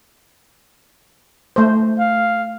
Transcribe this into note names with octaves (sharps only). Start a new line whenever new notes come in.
A3 C5
F5